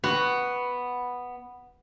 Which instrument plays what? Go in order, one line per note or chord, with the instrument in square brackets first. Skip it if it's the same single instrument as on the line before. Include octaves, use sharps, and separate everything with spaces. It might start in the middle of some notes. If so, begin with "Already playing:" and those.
[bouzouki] B3 [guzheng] F#4